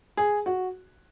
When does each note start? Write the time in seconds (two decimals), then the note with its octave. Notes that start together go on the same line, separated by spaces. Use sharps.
0.17 G#4
0.46 F#4